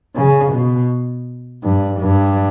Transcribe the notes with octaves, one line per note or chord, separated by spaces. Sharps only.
C#3
B2
G2
G2